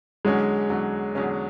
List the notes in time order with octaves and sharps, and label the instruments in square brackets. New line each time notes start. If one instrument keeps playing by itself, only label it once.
[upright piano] E2 D3 F#3 C#4 [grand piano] G#3
[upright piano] E2 D3 F#3 C#4
E2 D3 F#3 C#4